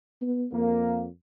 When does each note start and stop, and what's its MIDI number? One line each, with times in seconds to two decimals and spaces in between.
0.22 0.46 59
0.52 1.08 41
0.52 1.05 58